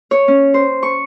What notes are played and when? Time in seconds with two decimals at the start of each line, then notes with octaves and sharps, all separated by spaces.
0.11 C#5
0.28 C#4
0.54 C5
0.83 C#6